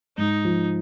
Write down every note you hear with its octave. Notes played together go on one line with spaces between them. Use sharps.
G#2 D#4
F3